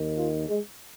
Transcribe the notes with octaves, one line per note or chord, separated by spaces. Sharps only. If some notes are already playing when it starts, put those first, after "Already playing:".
Already playing: D#2 D#3
F4
G#3